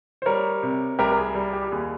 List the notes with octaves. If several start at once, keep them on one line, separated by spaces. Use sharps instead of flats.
C5
G3 A#4 C#5
C3
C2 G4 A#4
A#4
G#4
G3
G4
G4
D#2 G#4